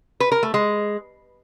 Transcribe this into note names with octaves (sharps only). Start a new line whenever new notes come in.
B4
A#4
A3
G#3